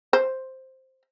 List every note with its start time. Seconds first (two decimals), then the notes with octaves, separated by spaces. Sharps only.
0.13 C5